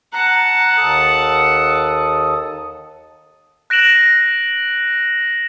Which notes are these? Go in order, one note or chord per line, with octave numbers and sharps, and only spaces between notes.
F#5 A5 A#5 F#6
D#2 A4 D#6
F#6 A#6 D7 E7 F#7